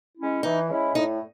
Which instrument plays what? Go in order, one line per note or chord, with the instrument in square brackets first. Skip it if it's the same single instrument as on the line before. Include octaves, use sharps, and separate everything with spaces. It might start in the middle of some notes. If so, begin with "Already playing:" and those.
[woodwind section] G#3 C#4 E4
[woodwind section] E3 [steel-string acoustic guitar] D#4
[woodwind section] G#3 C#4 E4
[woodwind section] A2 [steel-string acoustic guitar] D#4